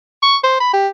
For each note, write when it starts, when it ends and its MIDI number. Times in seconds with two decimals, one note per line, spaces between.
0.23 0.37 85
0.43 0.57 72
0.60 0.72 83
0.73 0.88 67